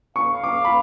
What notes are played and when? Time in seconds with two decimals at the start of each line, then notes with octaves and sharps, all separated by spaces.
0.16 F5 C#6
0.44 D6
0.65 B5